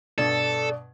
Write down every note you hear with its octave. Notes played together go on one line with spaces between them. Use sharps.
G2 B2 A4 D5 G#6